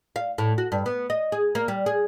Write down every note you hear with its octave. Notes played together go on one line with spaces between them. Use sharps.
F5
A2
F#4
G2
B3
D#5
G#4
A#3
G3
G#4